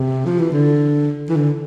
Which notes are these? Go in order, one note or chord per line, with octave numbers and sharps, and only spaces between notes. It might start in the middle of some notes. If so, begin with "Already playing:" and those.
Already playing: C3
F3
E3
D3
E3
D3